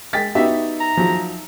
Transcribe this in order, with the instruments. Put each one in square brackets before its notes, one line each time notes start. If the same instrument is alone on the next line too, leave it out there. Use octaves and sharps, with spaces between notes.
[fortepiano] G#3 G5 [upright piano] A6 B6
[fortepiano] B3 F#4 G4 [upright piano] D#4 E5
[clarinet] A#5
[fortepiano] F3 F#3